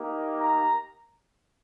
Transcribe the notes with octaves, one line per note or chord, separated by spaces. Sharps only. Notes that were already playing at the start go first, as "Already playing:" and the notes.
Already playing: A#3 D#4 G4
A#5